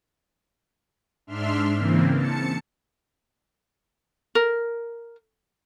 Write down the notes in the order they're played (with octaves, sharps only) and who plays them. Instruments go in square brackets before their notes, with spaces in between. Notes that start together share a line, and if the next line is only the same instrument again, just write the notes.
[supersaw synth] G#2 D4 E5 C6 F6
C#3 E3 A#3 C4
A5 C#7
[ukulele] A#4